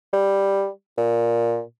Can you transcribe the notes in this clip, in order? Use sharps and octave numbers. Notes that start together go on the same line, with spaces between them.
G3
A#2